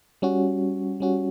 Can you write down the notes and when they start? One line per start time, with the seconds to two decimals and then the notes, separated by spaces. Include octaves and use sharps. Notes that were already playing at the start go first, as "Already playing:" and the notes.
0.22 G3 C#4 F#4
1.00 G3 C#4 F#4